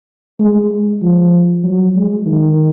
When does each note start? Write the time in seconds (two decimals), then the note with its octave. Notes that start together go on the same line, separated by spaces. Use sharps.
0.39 G#3
1.02 F3
1.64 F#3
1.96 G#3
2.26 D#3